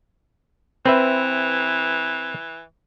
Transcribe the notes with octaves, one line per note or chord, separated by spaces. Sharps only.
E3 C4 B4 E5